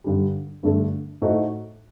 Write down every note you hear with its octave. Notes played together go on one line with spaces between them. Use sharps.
G2 D3 G3
G2 D3 A3 D4 A4
A2 A3 D#4 F#4 C5